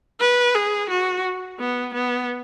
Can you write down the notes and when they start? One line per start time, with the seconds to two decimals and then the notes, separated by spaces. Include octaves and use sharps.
0.20 B4
0.55 G#4
0.89 F#4
1.59 B3
1.94 B3